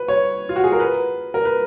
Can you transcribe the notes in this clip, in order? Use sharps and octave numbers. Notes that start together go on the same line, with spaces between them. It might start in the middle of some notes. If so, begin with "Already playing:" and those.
Already playing: B4
C#5
F4
F#4
G#4
A#4
B4
A#4
B4